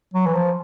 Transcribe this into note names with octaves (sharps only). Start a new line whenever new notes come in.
F#3
E3
F3